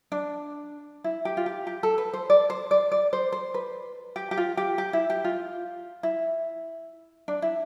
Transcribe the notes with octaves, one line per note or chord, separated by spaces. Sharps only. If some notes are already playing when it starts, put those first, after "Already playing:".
D4
E4
G4
F4
G4
G4
A4
B4
C5
D5
C5
D5
D5
C5
C5
B4
G4
G4
F4
G4
G4
E4
G4
F4
E4
D4
E4